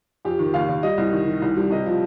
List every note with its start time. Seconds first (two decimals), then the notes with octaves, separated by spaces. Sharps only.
0.25 F2 G4
0.39 D#3
0.54 D#2 F5
0.68 D#2
0.83 G3 D#5
0.98 C2
1.12 D#3
1.27 D#3
1.42 C2
1.57 G3
1.71 C3 D#5
1.86 F3